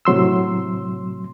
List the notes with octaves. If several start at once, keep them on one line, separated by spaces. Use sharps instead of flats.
A2 C3 F#3 C6 E6